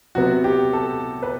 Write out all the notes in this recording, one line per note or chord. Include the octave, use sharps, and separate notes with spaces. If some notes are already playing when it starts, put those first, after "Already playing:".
C3 F#3 B3 F#4
G4
A4
B4